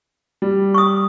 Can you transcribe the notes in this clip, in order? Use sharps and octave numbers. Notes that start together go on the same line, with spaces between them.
G3
C#6 D#6